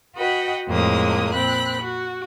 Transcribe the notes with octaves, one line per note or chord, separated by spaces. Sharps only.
F#4 B4 D#5 F#5 G5
F2 A2 G#3 A#3 D#6
A#2 C4 B5 F#6
F#4